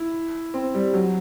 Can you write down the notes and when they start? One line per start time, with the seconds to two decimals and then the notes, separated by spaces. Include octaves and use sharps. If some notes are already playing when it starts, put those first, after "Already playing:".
Already playing: E4
0.54 C4
0.75 G3
0.94 F#3